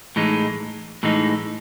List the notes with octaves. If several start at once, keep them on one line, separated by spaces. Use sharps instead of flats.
A2 E3 G#3 D#4
A2 E3 G#3 D#4